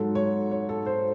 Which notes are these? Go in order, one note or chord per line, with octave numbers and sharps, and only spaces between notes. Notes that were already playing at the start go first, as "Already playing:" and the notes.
Already playing: G#2 F#3 A4
C#5
C#5
A4
C5